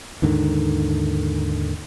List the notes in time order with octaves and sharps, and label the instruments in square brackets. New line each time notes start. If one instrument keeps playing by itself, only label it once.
[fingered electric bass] D#2 G#2 D3 D#3